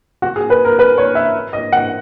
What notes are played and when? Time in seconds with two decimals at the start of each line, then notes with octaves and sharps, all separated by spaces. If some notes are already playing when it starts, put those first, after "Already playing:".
0.22 F#4
0.36 G#4
0.50 B4
0.65 A#4
0.79 B4
0.98 C#5
1.15 E5
1.53 D#5
1.72 F#5